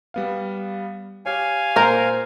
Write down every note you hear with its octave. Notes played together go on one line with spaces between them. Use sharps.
G3 B3 F5
G4 C#5 F5 G#5
A#2 A#4 C5